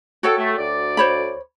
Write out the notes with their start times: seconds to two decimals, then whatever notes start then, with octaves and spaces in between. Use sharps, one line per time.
0.23 F#4 A4 C#5 G5
0.36 A3
0.58 D2 D5
0.97 C5 C#5 B5